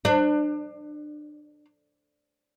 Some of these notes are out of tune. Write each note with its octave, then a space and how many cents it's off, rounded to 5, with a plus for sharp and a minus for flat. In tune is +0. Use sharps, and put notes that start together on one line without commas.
D4 +30